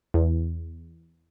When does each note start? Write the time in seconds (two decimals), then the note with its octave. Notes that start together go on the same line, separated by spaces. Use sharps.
0.14 E2